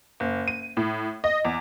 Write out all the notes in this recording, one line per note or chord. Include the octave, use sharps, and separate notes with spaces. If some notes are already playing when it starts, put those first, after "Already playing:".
F#1
D#7
A2
D#5
E2